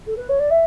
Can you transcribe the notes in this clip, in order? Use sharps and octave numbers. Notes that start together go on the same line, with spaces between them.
A4
B4
C#5
D5
E5